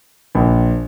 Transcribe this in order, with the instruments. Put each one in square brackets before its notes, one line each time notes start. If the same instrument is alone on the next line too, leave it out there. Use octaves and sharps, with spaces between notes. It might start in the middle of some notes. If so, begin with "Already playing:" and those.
[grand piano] A#1